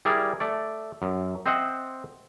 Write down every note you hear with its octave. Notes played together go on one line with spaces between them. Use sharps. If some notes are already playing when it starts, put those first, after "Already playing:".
G3 E4 G#4 A#4 D5
A3 D5
F#2
C4 C5 D#5 E5 F#5